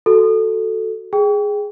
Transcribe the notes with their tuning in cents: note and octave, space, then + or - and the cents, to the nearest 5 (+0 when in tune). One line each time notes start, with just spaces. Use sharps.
F#4 +0 A4 +0
G#4 +0 G5 +0